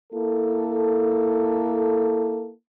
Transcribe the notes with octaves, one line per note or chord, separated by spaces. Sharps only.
A#3 E4 A4